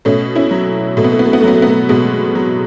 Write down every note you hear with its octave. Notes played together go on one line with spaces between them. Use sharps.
B2 A3 C#4
C#4 E4
F#3
B2 A3
B3
A3
B3
A3
B3
A3
F#3 B3
A3
B3
A3
B2 G#3 B3
F#3